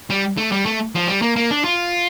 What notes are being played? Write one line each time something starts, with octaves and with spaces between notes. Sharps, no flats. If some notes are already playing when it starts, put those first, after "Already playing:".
G3
A3
G3
A3
F3
G3
A#3
A#3
D4
F4